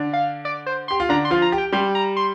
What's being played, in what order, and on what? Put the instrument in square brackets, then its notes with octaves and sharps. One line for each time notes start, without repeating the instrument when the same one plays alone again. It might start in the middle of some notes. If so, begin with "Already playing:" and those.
Already playing: [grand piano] D3 D4
[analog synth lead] F5
D5
C5
[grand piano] G4 [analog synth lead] C6
[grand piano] F4
[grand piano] D3 D4 [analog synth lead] A#5
[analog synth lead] C6
[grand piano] F3 F4
[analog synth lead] A#5
[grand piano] G4
[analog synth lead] G5
[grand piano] G3 G4 [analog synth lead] C6
[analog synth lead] A#5
C6